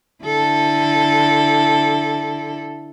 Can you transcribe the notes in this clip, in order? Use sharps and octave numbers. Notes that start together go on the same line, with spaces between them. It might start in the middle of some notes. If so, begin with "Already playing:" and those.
D3 E4 A4